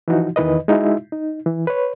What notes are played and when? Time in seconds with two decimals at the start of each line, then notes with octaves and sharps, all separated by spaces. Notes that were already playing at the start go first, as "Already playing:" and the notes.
0.08 E3 F3 D#4 F#4
0.36 E2 D#3 E3 B4 D#5
0.68 G#3 D#4 E4 F#4 E5
1.12 D#4
1.46 E3
1.67 B4 C#5